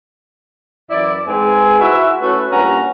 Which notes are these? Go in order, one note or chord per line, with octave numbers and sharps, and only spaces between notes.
F#2 E3 E4 D5
G#2 G#3 C4 B4 G#5
E4 F#4 E5
A3 C#4 F#4 B4
G2 A#2 C#4 F#5 A#5